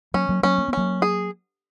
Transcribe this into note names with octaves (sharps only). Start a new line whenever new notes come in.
F#3 A#3 C#4
F#3 A#3
F#3 A#3 C#4
A#3
B3
F#3 A#3 C#4
G#4